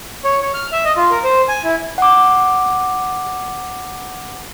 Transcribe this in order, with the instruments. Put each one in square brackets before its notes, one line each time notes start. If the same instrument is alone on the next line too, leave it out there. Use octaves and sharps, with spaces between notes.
[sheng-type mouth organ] C#5
C#5
F6
E5
D#5
F4
A#4
C5
G#5
E4
[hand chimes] F#5 D6